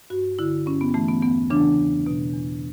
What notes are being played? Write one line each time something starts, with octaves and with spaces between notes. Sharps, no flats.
G2 F#4
D3 E4
G2 C#4
B3
E3 A3
B3
E2 B3
C#3 E3 D4
E2
B2
E2